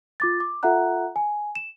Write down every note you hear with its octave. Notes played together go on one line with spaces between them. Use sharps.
F4 D6 A6
D6
F4 A4 E5 F#5 A#5 F#6
G#5
E7